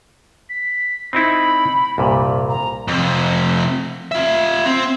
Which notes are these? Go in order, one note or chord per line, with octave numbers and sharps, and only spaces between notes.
B6
C4 D#4 E4 B5
C2 G2 A#2
A#5
F2 C3
F4 E5
C4